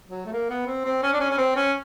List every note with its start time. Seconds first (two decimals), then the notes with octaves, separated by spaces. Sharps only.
0.08 F#3
0.26 A3
0.32 A#3
0.50 B3
0.67 C4
0.85 C4
1.03 C#4
1.13 D4
1.20 C#4
1.31 C#4
1.38 C4
1.56 C#4